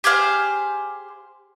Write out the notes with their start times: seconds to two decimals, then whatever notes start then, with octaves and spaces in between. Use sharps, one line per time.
0.04 G4 G#4 C5 F5